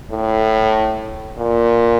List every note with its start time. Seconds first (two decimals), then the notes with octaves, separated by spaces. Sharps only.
0.11 A2
1.37 A#2